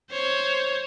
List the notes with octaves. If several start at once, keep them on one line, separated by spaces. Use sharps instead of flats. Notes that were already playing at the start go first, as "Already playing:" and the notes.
C5 C#5